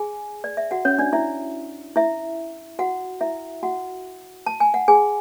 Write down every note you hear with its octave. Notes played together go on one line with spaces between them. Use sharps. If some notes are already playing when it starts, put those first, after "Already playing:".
Already playing: G#4 G#5
D5
E5
F#4 F#5
C#4 C#5
D4 D5
E4 E5
E4 E5
F#4 F#5
E4 E5
F#4 F#5
A5
G#5
F#5
G#4 G#5